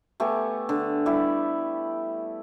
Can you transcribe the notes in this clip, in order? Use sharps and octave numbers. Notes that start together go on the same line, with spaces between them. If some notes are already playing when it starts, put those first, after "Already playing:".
A3 B3 G4 G#5
D3
G3 E4 G4 D5